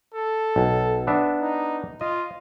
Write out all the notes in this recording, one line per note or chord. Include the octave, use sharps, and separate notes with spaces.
A4
B1
B3 D4 E5
D#4
F4 D#5